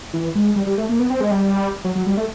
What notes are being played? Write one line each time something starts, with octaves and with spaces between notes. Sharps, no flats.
E3
G#3
G3
G3
A3
A#3
B3
C4
G#3
G3
F#3
F#3
G3
A3